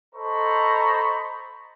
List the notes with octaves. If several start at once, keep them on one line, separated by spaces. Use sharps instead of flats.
A4 C5 D#5 A#5 B5 C#6